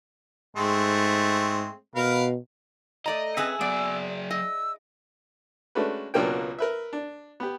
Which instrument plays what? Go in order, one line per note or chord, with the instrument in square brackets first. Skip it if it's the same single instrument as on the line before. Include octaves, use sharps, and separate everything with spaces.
[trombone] G#2 [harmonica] G#3 A3 C4
[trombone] B2 [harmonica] A#4 B4 F5
[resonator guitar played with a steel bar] A3 D5 A#5 [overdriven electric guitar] D#5
[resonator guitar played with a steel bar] C4 C#4 B4 [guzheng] E4 G#4 A5 [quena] E6
[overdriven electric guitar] F#3 G#4 [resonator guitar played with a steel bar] B3 [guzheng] D5
[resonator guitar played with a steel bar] D#5 [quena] E6
[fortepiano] G#3 A3 C#4 D4 F#4 B4
C#2 B2 F#3 A#3 D4 G5
A#4 B4 E5
D4
B3 G4